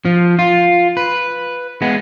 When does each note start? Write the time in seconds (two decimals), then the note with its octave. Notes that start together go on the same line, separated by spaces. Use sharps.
0.05 F3
0.39 F4
0.97 B4
1.82 G#3 B3